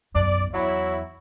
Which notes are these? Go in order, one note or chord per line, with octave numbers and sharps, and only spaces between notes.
B1 F#2 D5
E2 F#3 E4